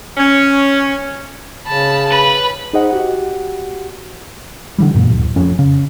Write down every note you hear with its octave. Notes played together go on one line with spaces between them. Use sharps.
C#4
C#3 A5 B5
B4 B5
D#4 G#4 C5 D#5 F#5
F#4 G4 F#5
D3 E3 G3
F#2 A#2
D1
F1 F2 C#4
C#3